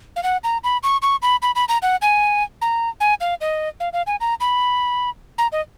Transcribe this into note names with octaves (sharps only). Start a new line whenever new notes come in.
F5
F#5
A#5
B5
C#6
C#6
B5
B5
B5
A#5
F#5
G#5
A#5
G#5
F5
D#5
F5
F5
G#5
A#5
B5
A#5
D#5